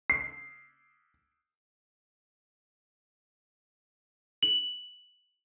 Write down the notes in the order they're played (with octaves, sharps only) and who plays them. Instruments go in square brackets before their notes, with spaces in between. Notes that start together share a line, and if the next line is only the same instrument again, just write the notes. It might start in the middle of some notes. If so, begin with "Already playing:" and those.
[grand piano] C7
[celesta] F#7